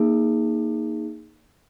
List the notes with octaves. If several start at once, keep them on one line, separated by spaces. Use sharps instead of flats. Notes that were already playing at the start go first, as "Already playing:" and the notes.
Already playing: A#3 D#4 G#4